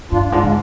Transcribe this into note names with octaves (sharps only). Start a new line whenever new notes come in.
G2 D4 F4
G#2 D4 F4
D3 G#3